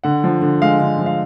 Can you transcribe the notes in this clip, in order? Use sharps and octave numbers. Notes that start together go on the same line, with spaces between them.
D3 F#5
F3
D3
G#3 F5
D3
F3
F5